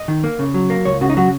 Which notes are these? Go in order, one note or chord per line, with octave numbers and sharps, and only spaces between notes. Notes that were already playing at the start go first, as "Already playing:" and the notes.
Already playing: D#5
D#3
A#3
C#3
F#3
A#3
C#2 C#5
C#3 F#4
D#4
F#3 F#4